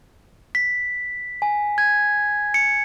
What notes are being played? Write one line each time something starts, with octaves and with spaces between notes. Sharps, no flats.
B6
G#5
G#6
C#7